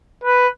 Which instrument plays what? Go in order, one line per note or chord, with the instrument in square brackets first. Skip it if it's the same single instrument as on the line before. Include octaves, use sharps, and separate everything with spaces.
[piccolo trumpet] B4